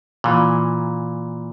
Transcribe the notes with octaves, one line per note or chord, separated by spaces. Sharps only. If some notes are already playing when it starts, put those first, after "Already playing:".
A#2 E3